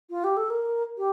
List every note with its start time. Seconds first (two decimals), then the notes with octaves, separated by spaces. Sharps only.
0.10 F4
0.24 G4
0.37 A4
0.50 A#4
0.98 G4